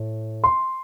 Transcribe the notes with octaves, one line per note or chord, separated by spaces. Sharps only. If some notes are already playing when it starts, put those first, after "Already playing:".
Already playing: A2
C6